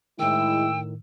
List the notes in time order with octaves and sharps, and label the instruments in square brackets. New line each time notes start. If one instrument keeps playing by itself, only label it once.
[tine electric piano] A2 D#3 [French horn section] G#3 E4 [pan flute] G5 [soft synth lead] E6